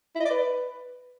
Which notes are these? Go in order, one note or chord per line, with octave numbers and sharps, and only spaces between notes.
E4
D#5
D5
B4